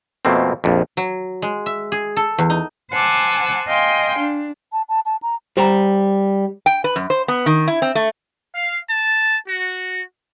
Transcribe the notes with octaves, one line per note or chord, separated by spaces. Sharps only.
F2 B2 A3 A#3 C4
A#1 F2
F#3
G#3
E5
G#4
A4
E2
D#4
C5 F#5 G#5 A5 D6 E6
D#5 F5 G5 G#5 C6
D4
A5
A5
A5
A#5
G3 C5 A#5
G5
B4
F#2
C5
B3
D#3
E4
C4
A3
F5
A5
F#4